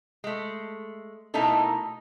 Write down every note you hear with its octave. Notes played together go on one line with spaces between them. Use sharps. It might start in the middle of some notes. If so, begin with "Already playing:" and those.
G#3 A3
B2 A3 A#3 D#4 E4 A4